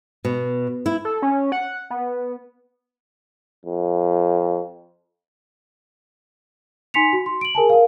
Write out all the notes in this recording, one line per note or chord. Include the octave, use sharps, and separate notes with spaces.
B2
E4
A4
C#4
F#5
B3
F2
D#4 G#5 C6 B6 C#7 F7
F#4
C6
D7 F#7
G#4 A#4 G#5 A5
A#4 F5